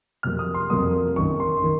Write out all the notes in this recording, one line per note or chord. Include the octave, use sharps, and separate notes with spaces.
F2 C3 F#3 A#3 F6
D#6
C6
F2 C3 F#3 A#3 D#6
F#2 D#3 A#3 C#6
C6
D#3 A#3